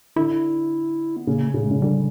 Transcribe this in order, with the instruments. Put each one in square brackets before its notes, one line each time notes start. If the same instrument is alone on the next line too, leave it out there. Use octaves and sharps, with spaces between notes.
[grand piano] D3 [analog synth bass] E4
[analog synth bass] B3
[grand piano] C#3 [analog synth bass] A#3
[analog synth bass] A3
[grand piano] C#3
[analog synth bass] G#3
[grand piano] C#3
[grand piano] D3 [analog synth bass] G3